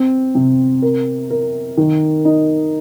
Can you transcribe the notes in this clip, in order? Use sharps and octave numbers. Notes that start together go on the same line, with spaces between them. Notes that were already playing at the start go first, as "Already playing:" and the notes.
Already playing: C4
C3
A#4
A#4
D#3
D#4